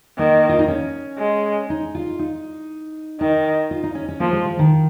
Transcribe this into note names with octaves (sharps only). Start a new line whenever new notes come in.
D#3 A#3
F4
D#4
C#4
G#3
D#4
F4
D#4
D#3 D#4
F4
D#4
C#4
C#4
F3 A#3
G#3
F3
D#3